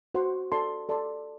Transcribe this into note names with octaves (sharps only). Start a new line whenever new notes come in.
F#4 C5 F#5 C6
A4 D5 A5 C6
A4 D5 A5 C6